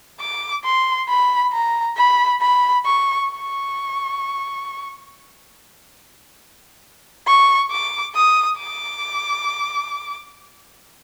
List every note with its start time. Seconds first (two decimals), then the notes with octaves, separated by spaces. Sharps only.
0.20 D6
0.64 C6
1.09 B5
1.53 A#5
1.97 B5
2.41 B5
2.85 C#6
3.30 C#6
7.27 C#6
7.71 D6
8.15 D#6
8.59 D6